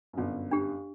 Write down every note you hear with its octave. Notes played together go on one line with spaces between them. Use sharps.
G1 F#2
D4 G4